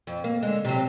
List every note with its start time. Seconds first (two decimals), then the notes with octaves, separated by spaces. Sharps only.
0.07 F2
0.24 A#3
0.43 D3 G#3
0.65 C3 F#3